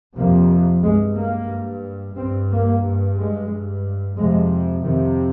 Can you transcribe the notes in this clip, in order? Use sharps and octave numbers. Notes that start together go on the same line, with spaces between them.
F2 C3 A#3
G2 G#3
A#3
G2
G2 C4
A#3
G2
G#3
G2
F2 C3 G#3
F2 C3 D#3